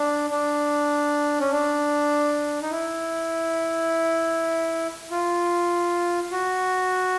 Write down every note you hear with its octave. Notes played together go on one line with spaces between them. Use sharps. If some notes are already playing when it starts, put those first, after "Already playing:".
Already playing: D4
D4
C#4
D4
D#4
E4
F4
F#4